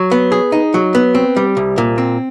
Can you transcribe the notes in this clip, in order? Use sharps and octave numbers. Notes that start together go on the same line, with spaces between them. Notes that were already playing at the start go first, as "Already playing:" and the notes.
Already playing: F#3
B3
G#4
D#4
F#3
B3
C4
G3
C2
A#2
C4